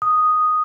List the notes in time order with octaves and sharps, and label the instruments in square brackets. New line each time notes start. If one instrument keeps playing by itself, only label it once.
[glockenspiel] D#6